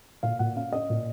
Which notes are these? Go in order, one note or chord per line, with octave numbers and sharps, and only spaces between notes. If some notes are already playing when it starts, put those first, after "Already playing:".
A#2 F5
A#2 F#5
C#4 F5
C#4 D#5
A#2